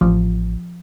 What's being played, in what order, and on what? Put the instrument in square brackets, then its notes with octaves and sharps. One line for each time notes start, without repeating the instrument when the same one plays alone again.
[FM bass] A1 [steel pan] F3